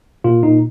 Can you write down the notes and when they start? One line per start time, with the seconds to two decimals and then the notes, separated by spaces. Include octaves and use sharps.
0.24 A#2 F4
0.43 A#2 D#4